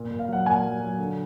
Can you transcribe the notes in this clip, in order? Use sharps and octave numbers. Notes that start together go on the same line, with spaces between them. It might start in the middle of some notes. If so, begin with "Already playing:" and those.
Already playing: A#2
A#2
F5
F#3 F#5
A#2 G#5
F#3
F#3
D3